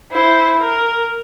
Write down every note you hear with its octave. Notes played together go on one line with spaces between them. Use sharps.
E4 C5
A#4